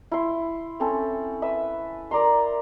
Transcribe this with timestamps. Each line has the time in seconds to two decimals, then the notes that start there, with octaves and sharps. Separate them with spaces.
0.11 E4 C6
0.80 C4 C#4 A4
1.42 B4 E5 E6
2.11 A#4 D5 A#5 C6